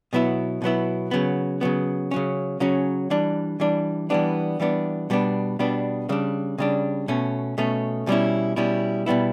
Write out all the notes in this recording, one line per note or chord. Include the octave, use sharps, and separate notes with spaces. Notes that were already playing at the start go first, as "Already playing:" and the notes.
B2 F#3 B3 E4
B2 F#3 B3 E4
C#3 F#3 B3
C#3 F#3 B3
C#3 F#3 C#4
C#3 F#3 C#4
E3 G3 D4
E3 G3 D4
E3 G3 B3 D4
E3 G3 B3 D4
B2 G3 B3 D4
B2 G3 B3 D4
C#3 G3 D4
C#3 G3 D4
B2 A3 C#4
B2 A3 C#4
B2 G3 C#4 E4
B2 G3 C#4 E4
B2 G3 B3 E4